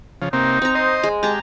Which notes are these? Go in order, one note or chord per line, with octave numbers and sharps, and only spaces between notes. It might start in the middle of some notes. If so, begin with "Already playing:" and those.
C#3 F3
C3 A#3 C4 D#4
C4 A#5
C5 D#5
G#3
G#3 G4 A5 A#5